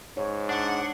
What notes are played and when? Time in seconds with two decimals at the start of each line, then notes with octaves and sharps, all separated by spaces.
0.17 G#2 C#5
0.49 D4 F#5